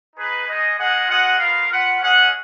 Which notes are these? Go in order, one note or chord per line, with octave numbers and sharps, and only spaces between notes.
D#4 G#4 B4
G#3 D#4 G#4 D#5
G#3 D#4 G#4 D#5 F#5
F4 G#4 D#5 F#5
B3 F4 A#4 F5
F4 B4 F#5
C#4 G#4 D#5 F#5